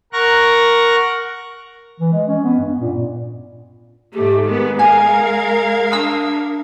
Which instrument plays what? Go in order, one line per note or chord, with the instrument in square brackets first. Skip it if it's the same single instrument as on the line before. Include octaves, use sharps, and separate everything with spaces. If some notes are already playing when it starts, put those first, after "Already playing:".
[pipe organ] A#4 F#5 C#6 A#6
[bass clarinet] E3
G#3
C#4
B3
G2
A#2
[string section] G#2 A3 [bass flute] G4
[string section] D#3 B3 [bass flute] G#3
[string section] A#4 F5 G#6 [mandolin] G#5
[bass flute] D4 [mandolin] D#6 E6